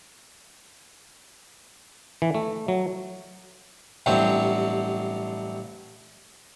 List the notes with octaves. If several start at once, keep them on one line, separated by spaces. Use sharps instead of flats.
E3
A3
F#3
A1 G2 C3 F#3 C4